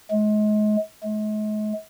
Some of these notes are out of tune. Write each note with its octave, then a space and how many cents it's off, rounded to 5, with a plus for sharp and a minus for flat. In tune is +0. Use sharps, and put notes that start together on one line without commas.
G#3 +35
G#3 +45